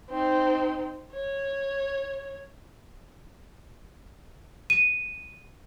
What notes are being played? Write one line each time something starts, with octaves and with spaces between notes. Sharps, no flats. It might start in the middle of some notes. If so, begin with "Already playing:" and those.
C4 D#4
C#5
D#7